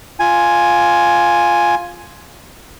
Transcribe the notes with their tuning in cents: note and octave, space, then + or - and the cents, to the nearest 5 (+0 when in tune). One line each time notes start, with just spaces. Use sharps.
F4 +0 G#5 +5